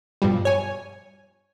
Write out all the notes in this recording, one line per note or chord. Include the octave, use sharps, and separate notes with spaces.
G2 B2 F3 G3
C#5 G#5